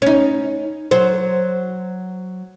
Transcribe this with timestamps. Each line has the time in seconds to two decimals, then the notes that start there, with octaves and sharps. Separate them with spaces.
0.02 C#4 D#4
0.91 F#3 C5